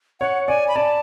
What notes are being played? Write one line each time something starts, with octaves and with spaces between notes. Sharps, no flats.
C#5 F#5
D5 G#5
B5
D5 A5